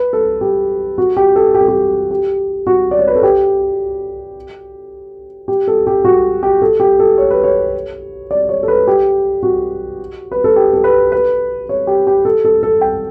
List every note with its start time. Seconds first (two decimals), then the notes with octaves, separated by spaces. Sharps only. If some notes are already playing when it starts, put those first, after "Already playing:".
Already playing: B4
0.13 A4
0.41 G4
0.98 F#4
1.17 G4
1.36 A4
1.54 G4
1.61 A4
1.68 G4
2.11 G4
2.67 F#4
2.91 D5
2.99 C#5
3.08 B4
3.16 A4
3.23 G4
5.48 G4
5.68 A4
5.87 G4
6.05 F#4
6.43 G4
6.62 A4
6.80 G4
6.99 A4
7.18 C#5
7.31 B4
7.44 C#5
8.31 D5
8.49 C#5
8.63 A4
8.68 B4
8.88 G4
9.43 F#4
10.32 B4
10.44 A4
10.56 G4
10.73 A4
10.84 B4
11.12 B4
11.69 C#5
11.87 G4
12.07 G4
12.25 A4
12.45 A4
12.63 A4
12.81 G5